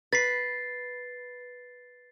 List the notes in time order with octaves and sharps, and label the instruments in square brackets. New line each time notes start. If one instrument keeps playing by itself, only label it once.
[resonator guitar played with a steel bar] B4 [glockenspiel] A6 C7